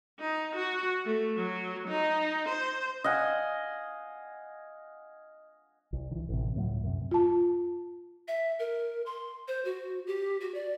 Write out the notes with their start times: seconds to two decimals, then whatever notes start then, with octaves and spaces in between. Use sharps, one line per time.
0.20 D#4
0.55 F#4
1.05 A3
1.37 F#3
1.88 D#4
2.49 C5
3.04 D#5 F5 F#5 G#5
5.93 C2
6.11 D#3 E3
6.29 A1 C3
6.56 C#2 A2 F3 F#3
6.84 F#2 C3
7.11 F4 A5
8.28 E5
8.59 A#4
9.06 C6
9.48 C5
9.65 F#4
10.07 G4
10.41 F#4
10.54 D5